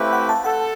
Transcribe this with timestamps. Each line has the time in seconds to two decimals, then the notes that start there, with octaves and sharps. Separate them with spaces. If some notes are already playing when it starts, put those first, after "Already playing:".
Already playing: A3 C4 E4 G4 B4 F5
0.13 F#5
0.29 A5
0.44 A4 F#5